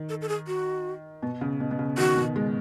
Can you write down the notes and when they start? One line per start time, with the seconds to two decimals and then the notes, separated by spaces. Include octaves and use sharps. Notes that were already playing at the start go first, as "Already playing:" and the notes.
Already playing: D#3
0.09 A4
0.22 A4
0.29 G#4
0.47 F#4
1.23 B2
1.41 C#3
1.60 B2
1.71 B2
1.79 C#3
1.98 D#3 F#4
2.16 B2
2.36 G#3